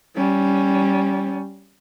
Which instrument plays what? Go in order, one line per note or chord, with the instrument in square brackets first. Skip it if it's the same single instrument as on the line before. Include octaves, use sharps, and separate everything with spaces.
[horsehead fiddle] G3 C#4